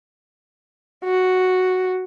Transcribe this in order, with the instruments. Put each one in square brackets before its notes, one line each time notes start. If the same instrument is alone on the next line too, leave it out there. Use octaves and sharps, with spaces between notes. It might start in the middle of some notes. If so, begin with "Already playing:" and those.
[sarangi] F#4